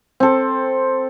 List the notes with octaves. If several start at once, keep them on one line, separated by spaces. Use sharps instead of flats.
C4 A4